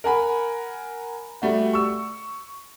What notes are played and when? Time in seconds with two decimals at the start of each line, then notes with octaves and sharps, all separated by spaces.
0.04 A#4 F#5 G#5 A#5 B5
1.42 G3 A3 F#4
1.73 C#6 E6